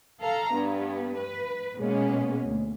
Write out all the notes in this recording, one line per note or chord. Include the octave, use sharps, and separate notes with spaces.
A4 F5 A#5
G2 B3
B4
B2 G#3 A#3 B3 C#4
D2